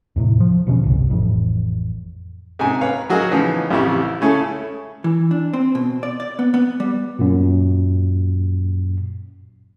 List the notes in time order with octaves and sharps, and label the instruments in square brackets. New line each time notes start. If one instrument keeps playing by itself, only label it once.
[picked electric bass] E2 A2 C3
F3
E1 B2 D3 C#4
G1 C2
A1 F2
[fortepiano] G#2 C3 G#5
B4 C#5 F5
F#3 F#4 G#4 A#4 D#5
C#3 E3 F3 B3 D#4
A1 F2 C#3 E4 G4 C#6
C#3 A3 C#4 E4 G#4 A4
[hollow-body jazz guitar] E3
D4
C4
B2
D5
D5
B3
B3
G3
[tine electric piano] F#2 A#2